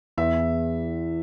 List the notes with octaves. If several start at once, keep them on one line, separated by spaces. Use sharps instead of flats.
E2 E5